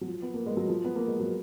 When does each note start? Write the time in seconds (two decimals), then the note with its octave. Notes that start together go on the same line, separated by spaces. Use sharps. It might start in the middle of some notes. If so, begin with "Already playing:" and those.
0.01 F#3
0.07 F3
0.22 B3
0.34 A#3
0.46 G#3
0.57 F#3
0.68 F3
0.85 B3
0.96 A#3
1.08 G#3
1.20 F#3